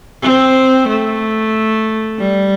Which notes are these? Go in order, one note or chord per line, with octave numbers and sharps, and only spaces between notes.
C4
A3
G3